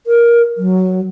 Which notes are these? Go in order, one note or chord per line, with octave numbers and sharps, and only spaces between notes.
A#4
F#3